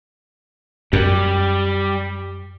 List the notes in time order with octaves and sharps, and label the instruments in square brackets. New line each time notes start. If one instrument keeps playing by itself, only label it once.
[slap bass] F#2 [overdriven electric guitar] G3